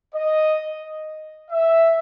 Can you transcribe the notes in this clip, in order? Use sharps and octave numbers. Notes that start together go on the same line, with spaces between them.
D#5
E5